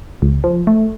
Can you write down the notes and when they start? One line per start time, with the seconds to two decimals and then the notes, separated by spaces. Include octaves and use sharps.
0.22 C#2
0.44 F3
0.67 A3